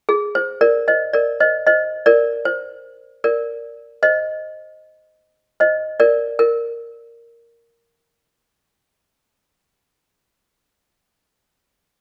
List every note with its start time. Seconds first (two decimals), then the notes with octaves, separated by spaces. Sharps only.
0.09 G#4
0.35 C5
0.61 A#4 D5
0.88 C5 D#5
1.13 A#4 D5
1.40 C5 D#5
1.67 C5 D#5
2.06 A#4 D5
2.45 C5
3.24 A#4 D5
4.03 C5 D#5
5.60 C5 D#5
6.00 A#4 D5
6.39 A#4